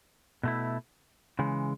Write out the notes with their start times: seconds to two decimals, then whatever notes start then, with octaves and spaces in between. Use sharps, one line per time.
0.43 B2 A3 E4
1.39 C#3 E3 G#3